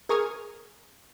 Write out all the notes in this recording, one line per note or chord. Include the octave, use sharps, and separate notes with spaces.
G#4 A#4 C#6 D#6 F6 G#6